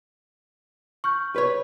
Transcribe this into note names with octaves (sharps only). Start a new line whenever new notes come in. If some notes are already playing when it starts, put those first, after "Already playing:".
C#6 F6 G6
B4 C#5